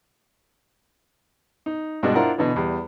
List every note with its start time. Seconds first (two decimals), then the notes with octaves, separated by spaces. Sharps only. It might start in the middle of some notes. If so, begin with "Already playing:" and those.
1.66 D#4
2.03 G2 B2 G#3 D4 F#4
2.15 D4 E4 F4 A#4 C5 F#5
2.38 B2 D3 E3
2.56 E2 G3